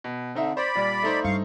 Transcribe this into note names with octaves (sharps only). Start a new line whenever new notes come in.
B2
D3 C4 D#4 E5
C5 D5 B5
A#2 G3
A3 D#4 C5
G2 F5 C#6